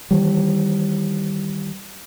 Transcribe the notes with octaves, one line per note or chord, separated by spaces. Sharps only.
D#3 E3 G3